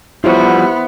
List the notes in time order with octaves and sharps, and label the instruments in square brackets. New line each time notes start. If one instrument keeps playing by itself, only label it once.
[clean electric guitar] F3 G3 F#4 [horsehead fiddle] B3 [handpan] E4 C5